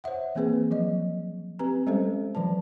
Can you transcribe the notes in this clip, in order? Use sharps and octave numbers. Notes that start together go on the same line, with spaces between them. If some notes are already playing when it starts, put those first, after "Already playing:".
C5 C#5 E5 F#5
E3 A#3 C4 G#4 B4
F3 F#3 D#5
C4 G4 B4 A#5
G3 G#3 C#4 A4 C5
E3 F#3 B4 A5